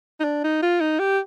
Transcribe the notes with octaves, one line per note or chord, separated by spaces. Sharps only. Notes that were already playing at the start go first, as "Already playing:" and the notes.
D#4
D4
D#4
F4
D#4
G4